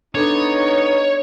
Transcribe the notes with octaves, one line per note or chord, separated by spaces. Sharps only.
B3 D4 D#4 A4 C#5